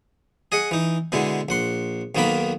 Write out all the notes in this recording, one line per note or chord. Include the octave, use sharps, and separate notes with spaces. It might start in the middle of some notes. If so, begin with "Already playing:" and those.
G#4 D#5 F#5
E3 D#4
B2 D3 G#3 E4
A#1 F#5 C6
B1 D#3 A#3 B3 A#4 B5